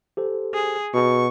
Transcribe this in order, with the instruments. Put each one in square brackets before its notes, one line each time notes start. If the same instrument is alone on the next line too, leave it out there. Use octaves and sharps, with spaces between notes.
[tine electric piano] G4 A4 C5
[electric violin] G#4
[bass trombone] B2 [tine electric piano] F#4 G#4 [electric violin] C#6